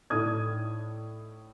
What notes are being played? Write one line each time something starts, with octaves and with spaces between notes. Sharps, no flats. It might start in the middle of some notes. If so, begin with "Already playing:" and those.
A2 D#4 A4 D5 D#6 G#6